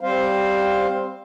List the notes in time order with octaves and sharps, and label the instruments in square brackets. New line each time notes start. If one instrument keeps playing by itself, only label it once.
[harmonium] G3 C4 C5 F5